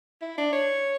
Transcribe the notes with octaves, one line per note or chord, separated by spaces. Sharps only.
E4
D4
C#5